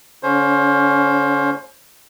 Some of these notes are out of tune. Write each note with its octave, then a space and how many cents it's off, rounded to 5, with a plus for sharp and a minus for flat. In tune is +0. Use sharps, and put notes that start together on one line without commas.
D3 -40 C#4 +25 C5 +25